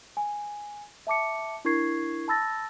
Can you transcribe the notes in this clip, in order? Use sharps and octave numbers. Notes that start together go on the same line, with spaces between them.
G#5
E5 A5 D6 C#7
D4 E4 A#4 C#6 G#6 C7
A5 B5 E6 A6 A#6